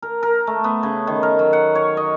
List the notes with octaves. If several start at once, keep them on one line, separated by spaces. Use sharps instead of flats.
A#4
A#4
A3
B3
C#3
D#3
A#4
F#3
F#5
C#5
D#5